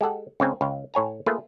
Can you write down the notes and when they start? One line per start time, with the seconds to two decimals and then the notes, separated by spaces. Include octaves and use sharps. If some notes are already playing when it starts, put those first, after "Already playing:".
0.01 G#3 G4 A4 F#5
0.40 C#2 C#3 C4 G#5 A#5
0.61 C#2 F5 G5
0.94 A2 C#5 G#5 A#5
1.26 A3 A#3 F4 G#4 B4